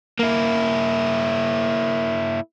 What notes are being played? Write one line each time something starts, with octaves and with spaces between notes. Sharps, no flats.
A#3 E4